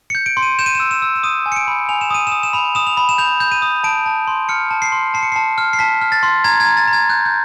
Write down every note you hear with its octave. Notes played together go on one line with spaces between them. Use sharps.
G6 C#7
D7
C6
D#7
G6 E7
D#7
E6 E7
E7
E6
E7
D#6 D#7
G#5
C#7
D7
B5
G#5 F7
E7
D#6 D#7
D#6 E7
E7
B5 F7
D#6 E7
F7
B5
E7
G6 F7
G6
D#7
D#6
A5 D7
A5
C6
F6 C#7
A5
C7
C6
A5 C7
C#7
A5 C7
F6
C7
A5 B6
F6
A6
C6
A#5 G#6
G#6
A#5
A6
A#5
G#6
F#6 G6
G6